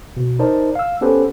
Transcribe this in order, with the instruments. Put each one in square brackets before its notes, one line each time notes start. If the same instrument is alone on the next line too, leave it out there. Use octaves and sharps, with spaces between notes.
[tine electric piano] B2
D#4 A#4 C5 D5 A5
F5 E6
B3 C#4 G4 A4 B4 C5